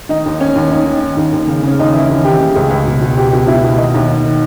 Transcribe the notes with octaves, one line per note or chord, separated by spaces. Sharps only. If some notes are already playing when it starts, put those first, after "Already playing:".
D#3 D#4
D#2
D#3 C#4
D#2
D#3 D#4
D#3
D#3
D#2
D#2
C#3
C#3 C#4
D#2 D#4
E3 E4
D#2
D#2 G4
C#3
C#2 G#4
C#2
B2
B2
B2 G4
B2
B2 E4
B2
D#3 D#4
D#2
D#3
D#3